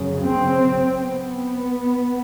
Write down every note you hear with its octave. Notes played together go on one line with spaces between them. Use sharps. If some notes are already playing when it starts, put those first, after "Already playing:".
Already playing: F#2 C#3
C4
B3